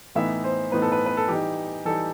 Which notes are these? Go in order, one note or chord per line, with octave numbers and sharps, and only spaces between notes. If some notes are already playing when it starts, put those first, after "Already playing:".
A2 E3 B3 D#4 E5
C5
A2 E3 B3 D#4 B4
A4
B4
B4
A4
E3 G3 D#4 G4
E3 G3 D#4 A4